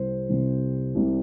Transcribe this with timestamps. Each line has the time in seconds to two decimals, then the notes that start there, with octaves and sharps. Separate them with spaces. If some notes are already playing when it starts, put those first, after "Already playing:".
Already playing: C2 C3 G3 C5
0.29 C2 C3 G3
0.95 C2 C3 G3